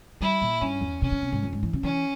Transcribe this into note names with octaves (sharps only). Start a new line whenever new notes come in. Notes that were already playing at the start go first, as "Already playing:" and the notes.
G3 E4
A#2
G2 C#4
E2
C3 C#4
C#3
C3
G#2
F2
G#2
E3
C#3
E3 C#4